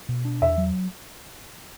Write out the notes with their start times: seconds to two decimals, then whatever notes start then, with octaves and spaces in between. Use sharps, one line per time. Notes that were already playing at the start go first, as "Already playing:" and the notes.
0.09 B2
0.25 D4
0.41 E2 E5
0.58 F#3